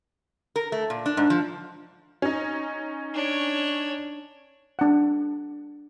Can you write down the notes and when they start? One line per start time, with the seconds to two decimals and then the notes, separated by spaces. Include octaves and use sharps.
0.56 A#4
0.72 A3
0.90 A#2
1.06 D4
1.17 G#2
1.30 F3
2.22 C#4 D#4
3.15 D4 C#5
4.79 D4 F#5